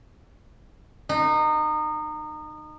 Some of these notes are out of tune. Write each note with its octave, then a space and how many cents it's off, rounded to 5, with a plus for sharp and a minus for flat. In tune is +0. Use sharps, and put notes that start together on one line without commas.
D#4 -25